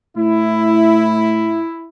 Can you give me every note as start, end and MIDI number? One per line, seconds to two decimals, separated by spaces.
0.16 1.61 45
0.16 1.87 64